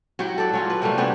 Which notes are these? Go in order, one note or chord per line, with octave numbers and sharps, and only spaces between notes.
F#3 E4 F#4 G4
A4 D5
F#3 C#4 F4
B4
C3 G3 A3 A#3
B3 C#4 D4 G4